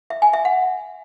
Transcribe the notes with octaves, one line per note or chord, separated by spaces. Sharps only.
E5
G#5
E5
F#5